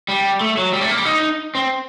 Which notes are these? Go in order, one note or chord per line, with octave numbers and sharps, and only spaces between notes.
G3
A3
F#3
G3
A3
A#3
G3
D#4
C4